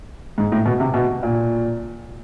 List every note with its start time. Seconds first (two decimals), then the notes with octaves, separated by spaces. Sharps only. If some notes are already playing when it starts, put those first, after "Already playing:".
0.38 G#2
0.52 A2
0.66 B2
0.80 C3
0.94 B2
1.23 A#2